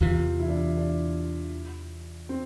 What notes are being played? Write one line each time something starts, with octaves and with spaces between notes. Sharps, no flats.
E2 C3 E3 F4
E4
D4
E4
D4
C4